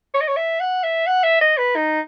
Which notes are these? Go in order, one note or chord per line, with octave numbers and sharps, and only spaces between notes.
C#5
D#5
C#5
E5
F#5
E5
F#5
E5
D#5
B4
D#4